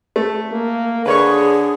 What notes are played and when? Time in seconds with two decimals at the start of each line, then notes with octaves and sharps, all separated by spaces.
0.16 A3
0.52 A#3
1.06 D3 G#4 B4 C#5 C#6